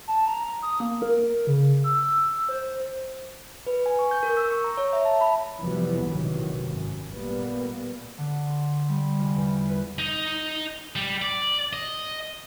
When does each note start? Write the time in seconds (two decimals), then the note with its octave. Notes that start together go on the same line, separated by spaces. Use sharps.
0.08 A5
0.27 A#5
0.63 D#6
0.80 A#3
1.02 A#4
1.47 C#3
1.84 E6
2.49 C5
3.67 B4
3.86 G#5
3.99 C#6
4.11 G6
4.23 A#4
4.37 E6
4.50 C#6
4.64 A#5
4.77 C#5
4.93 E5
5.05 A5
5.21 B5
5.60 F2 C3 E3 F#3 G3 B3
6.05 A#1 A2 C3 D#3 E3 F#3
6.60 G#1 F#2
7.11 A#2 G3 A#3 B3
8.18 D3
8.47 C6
8.88 G3
9.19 F1
9.36 E2
9.69 B4
9.99 D#4
10.96 G3
11.22 D5
11.73 D#5